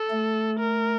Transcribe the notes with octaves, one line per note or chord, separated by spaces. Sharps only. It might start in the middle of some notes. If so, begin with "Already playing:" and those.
Already playing: A4
A3
A#4